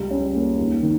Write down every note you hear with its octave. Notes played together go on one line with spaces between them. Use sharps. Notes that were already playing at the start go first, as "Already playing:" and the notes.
Already playing: C#2 G3
C#4
A#3
D#2
D#3